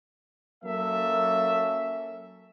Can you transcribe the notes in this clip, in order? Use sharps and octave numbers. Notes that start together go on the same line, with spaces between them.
F#3 A#3 C#4 A4 E5